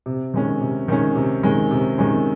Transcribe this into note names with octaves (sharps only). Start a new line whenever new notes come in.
C3
D#3 G#3 C#4
C3
D#3 G#3 C#4
C3
D#3 G#3 C#4
C3
D#3 G#3 C#4